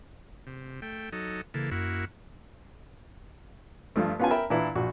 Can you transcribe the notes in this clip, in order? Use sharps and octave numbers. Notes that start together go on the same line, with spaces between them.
C3
A3 G5
F#3 D#4 A4
C#3 E3 A#3 A4
F#2 A#3 E4 F#4
G2 F3 A3
B3 C#4 F4 G4 B4 G#5
A#4 E5 G5 A#5 B5
A#2 E3 D4 E4 B4
A#1 F#4